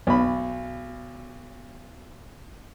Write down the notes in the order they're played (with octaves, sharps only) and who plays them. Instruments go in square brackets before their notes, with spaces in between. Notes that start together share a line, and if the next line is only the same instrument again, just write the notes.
[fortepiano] B1 B5